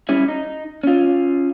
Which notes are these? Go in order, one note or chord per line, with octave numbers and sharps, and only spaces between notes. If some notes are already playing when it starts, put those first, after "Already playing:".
G3 C#4 E4
D#4
C#4 F4